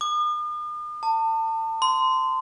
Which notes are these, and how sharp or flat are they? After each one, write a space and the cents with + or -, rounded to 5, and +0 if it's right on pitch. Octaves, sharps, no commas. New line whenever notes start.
D#6 -45
A5 +35
C6 -20